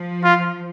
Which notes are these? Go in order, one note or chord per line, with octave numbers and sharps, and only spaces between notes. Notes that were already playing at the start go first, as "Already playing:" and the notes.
Already playing: F3
F4